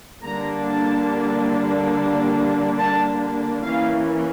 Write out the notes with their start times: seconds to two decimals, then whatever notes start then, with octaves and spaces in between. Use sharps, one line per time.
0.23 D3 G3 A#3 D4 A#5
0.65 A5
2.79 A5
3.64 E3 A#3 C#4 F5